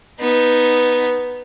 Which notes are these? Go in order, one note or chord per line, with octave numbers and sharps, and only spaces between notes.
B3 D#4